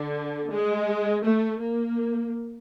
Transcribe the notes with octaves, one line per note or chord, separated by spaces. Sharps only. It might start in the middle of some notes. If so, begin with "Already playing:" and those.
Already playing: D3
G#3
A3
A#3